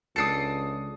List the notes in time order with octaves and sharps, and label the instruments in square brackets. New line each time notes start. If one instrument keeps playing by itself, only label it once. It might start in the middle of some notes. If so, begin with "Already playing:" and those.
[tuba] C#2 [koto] D4 A4 [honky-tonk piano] D#6 C7 C#7